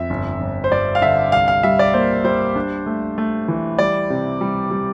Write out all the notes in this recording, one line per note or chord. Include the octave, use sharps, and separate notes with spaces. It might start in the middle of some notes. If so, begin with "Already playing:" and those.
Already playing: F2 E5
G1
G1
C5
G2 D5
F5
D3 E5
C2 F5
F5
G3 E5
D5
A#3 C5
G3 C5
D4
A3
A3
E3
G3 D5
C3
G3
G3